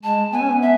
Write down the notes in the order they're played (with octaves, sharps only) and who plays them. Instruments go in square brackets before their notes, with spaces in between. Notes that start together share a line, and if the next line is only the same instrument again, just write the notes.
[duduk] G#3 [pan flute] A5
[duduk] B3 [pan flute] G#5
[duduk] C#4
B3
[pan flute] E5